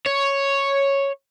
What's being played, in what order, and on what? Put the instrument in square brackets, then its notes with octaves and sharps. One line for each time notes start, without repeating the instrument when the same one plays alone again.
[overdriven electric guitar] C#5